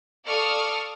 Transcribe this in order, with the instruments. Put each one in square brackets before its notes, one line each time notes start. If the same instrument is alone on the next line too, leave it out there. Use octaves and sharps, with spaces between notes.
[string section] A4 D5 F5 C#6 D#6 F6